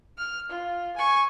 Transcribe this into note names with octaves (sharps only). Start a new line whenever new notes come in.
F6
F4
G#5 C#6